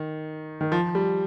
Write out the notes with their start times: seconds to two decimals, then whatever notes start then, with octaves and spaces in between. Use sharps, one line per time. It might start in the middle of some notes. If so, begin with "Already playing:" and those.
Already playing: D#3
0.61 D#3
0.72 F3
0.95 G3